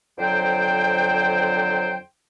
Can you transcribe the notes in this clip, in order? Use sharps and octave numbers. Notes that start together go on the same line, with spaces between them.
F2 D3 F#3 C5 G5